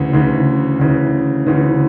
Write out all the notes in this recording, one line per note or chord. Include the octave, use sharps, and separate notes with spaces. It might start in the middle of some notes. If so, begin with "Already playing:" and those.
Already playing: D2 C#3 E3
D2 C#3 E3
D2 C#3 E3
D2 C#3 E3